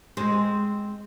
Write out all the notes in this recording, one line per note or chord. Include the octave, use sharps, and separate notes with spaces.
G#3 C4